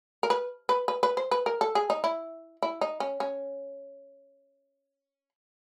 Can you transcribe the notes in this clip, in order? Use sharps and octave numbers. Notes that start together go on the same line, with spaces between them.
A#4
B4
B4
B4
B4
C5
B4
A#4
A4
G#4
D#4
E4
E4
D#4
C#4
C#4